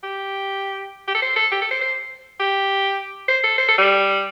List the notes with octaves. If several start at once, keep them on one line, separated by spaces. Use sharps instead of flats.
G4
G4
A4
C5
A4
G4
A4
C5
C5
G4
C5
A4
C5
A4
G3